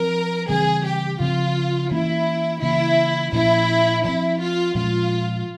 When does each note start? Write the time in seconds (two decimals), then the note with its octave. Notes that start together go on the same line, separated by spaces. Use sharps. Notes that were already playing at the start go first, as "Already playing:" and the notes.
Already playing: F3 C4 A#4
0.49 C#3 E3 G3 C4 G#4
0.85 G4
1.20 C#3 F3 C4 F4
1.91 E3 A#3 C#4 E4
2.62 C#3 E3 A#3 C#4 E4
3.33 A#2 F3 A#3 C#4 E4
4.04 F3 C4 E4
4.40 F4
4.75 A#2 F3 G#3 C#4 F4